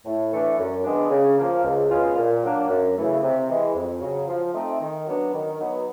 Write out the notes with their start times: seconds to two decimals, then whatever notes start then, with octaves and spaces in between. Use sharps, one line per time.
0.05 A2
0.32 E3 A3 D4
0.58 F#2
0.84 D#3 G#3 B3 D4
1.10 C#3
1.37 F3 A#3
1.63 C#2
1.90 B2 G#3 C#4 F4
2.16 A#2
2.43 F#3 A#3 D4
2.69 F#2
2.95 C#3 E3 A3
3.22 C3
3.49 E3 G#3
3.75 F2
4.01 C#3 F#3
4.28 F3
4.54 A3 C4 D#4
4.80 D#3
5.07 F#3 B3 D4
5.33 D#3
5.59 F#3 B3 D#4